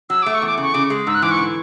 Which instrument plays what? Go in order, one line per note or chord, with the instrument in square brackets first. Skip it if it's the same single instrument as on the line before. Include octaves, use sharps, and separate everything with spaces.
[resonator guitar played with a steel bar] F#3 [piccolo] E6
[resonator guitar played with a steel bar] A3 [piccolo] D6
[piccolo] C#6
[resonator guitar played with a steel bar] E2 [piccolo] D6
[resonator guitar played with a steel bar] C#3
[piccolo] C#6
[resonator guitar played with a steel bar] C#3 [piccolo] D6
[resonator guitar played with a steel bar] G#3
[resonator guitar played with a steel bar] G#2 [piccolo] E6
[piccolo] F#6
[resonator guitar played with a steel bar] E3 [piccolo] D6
[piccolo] C#6
[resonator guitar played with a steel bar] D3